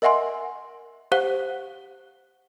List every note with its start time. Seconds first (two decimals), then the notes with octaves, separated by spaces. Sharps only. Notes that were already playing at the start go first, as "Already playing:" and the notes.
0.02 A#4 D#5 E5 F#5 G#5 C6
1.12 G4 C5 F5 F#5 F#6 G7